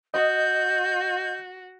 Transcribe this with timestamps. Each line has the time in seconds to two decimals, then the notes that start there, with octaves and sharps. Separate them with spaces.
0.14 F#4 D#5 G6